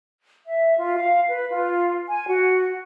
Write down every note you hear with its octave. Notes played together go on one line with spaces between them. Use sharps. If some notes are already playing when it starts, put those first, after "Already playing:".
E5
F4
F5
B4
F4
G#5
F#4